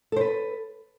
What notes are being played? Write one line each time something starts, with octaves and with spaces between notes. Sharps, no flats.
A4 B4 C5